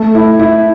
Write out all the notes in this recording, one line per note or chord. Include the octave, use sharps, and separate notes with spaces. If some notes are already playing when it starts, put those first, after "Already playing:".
Already playing: A3
E4
E4